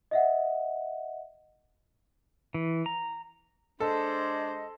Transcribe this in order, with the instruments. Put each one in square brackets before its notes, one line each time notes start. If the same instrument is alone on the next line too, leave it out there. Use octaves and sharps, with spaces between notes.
[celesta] D#5 E5 F#5
[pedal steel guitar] E3
A#5
[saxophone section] G#3 D4 [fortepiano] A4 [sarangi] C5 [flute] D#5